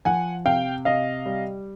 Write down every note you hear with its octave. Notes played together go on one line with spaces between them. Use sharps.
F3 F#5 G#5
C3 F5 G5
C3 D#5 F5
G3